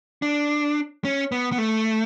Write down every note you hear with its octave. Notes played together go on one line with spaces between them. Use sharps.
D4
C#4
B3
B3
A3